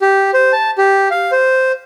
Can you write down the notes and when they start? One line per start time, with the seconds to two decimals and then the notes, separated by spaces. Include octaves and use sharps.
0.02 G4
0.34 C5
0.53 A5
0.78 G4
1.11 F5
1.32 C5